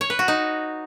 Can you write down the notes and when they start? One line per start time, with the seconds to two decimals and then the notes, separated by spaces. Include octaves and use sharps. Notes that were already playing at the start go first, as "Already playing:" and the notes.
0.01 C#5
0.10 B4
0.19 F#4
0.28 D#4